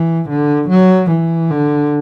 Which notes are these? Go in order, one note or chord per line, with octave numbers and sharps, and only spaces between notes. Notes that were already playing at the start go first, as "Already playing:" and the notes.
Already playing: E3
D3
F#3
E3
D3